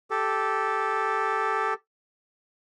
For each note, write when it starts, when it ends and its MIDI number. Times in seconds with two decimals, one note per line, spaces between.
0.10 1.74 67
0.10 1.74 69